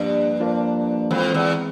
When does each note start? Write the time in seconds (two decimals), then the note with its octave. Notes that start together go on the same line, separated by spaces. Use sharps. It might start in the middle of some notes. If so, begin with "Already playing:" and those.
Already playing: G2 F3 A#3 D4
0.40 F3 A#3 D4
1.11 F2 E3 G#3 C4
1.34 E2